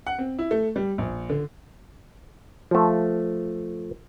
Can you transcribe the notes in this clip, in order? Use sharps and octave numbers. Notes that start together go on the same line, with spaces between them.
F#5
C4
E4
A3
G3
A#1
D3
F3 A3